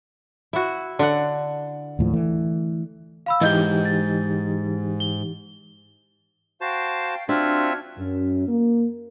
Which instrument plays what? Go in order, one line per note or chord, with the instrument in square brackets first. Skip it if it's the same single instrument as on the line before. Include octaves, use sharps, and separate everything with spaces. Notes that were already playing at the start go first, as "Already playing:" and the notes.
[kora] E4 F#4
D3 F#5
[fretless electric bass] D#2 A2 F3
E3 A3
[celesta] F5 B5 E6
[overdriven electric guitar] G#2 [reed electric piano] E3 D#4 G4 [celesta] D#5 G6 G7
[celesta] A6
G7
[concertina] F#4 C5 A5 [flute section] F5 G5
[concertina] C4 F4 E5 [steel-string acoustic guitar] D4 [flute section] F#4 F6 G#6
[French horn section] F#2
A#3